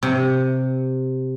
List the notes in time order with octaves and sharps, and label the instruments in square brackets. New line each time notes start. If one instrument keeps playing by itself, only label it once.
[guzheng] C3